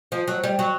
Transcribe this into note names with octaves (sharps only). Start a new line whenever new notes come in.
F3
F#3
G3
F#3